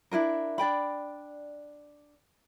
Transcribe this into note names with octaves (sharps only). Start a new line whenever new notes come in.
D4 E4 F4 A#4
D4 D5 G5 B5